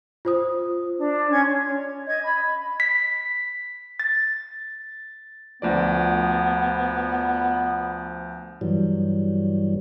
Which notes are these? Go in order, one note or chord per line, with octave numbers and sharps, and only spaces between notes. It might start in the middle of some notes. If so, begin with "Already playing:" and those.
F4 C5 D#6
D4
C#4 C6 G#6
C#5
D#5 G#6
B5
B6
A6
D2 F3 B3 D5
G2 E3 F#3 G3